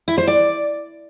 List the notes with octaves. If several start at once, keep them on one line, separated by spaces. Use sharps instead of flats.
E4
C5
D5